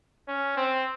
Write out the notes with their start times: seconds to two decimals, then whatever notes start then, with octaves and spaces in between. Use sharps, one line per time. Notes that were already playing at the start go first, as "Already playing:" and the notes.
0.28 C#4
0.57 C4